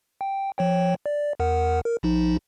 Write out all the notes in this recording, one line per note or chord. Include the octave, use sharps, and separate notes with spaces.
G5
F3 C#5 G5
D5
E2 A#4 F#5
A#4
A#1 F3 D#4